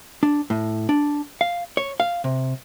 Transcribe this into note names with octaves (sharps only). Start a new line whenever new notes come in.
D4
A2
D4
F5
C#5
F5
C3